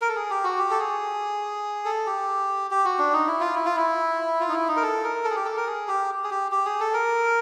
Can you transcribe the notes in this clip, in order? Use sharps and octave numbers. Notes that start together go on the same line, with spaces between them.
A#4
A4
G#4
G4
F#4
G4
A4
G#4
A4
G4
G4
F#4
D4
D#4
E4
F4
E4
F4
E4
F4
D#4
E4
D#4
A#4
A4
A#4
A4
G#4
G4
A4
A#4
G#4
G4
G#4
G4
G4
G#4
A4
A#4